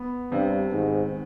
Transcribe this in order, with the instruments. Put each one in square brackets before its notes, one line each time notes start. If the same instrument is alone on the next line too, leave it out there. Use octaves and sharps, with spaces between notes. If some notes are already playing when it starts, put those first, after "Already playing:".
Already playing: [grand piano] B3
[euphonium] G2 [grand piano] C3
[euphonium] G#2 [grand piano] D#3